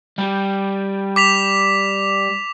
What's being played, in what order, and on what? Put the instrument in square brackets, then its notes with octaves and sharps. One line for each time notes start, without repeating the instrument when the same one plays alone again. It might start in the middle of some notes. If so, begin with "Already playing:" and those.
[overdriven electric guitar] G3
[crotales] D6 B6 F7